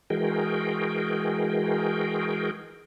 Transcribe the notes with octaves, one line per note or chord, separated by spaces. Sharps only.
E3 G#3 F#4 G#4 A#4 G5